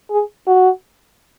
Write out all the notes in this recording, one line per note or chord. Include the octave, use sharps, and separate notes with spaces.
G#4
F#4